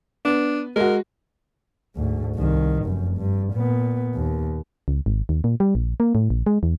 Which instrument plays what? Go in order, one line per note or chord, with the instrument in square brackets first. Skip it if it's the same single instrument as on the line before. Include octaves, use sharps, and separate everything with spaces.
[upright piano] B3 [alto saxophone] D4
[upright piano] G#3 F#4 [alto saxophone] A#4
[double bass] D2 G#2
C2 D#3
F1 F#2
G2
A#2 B3
D#2
[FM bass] C#2
G#1
D#2
A#2
G3
A#1
A#3
A2
A#1
G#3
E2